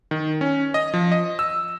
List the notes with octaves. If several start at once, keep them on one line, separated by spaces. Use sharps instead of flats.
D#3
C#4
D#5
F3
D#5
E6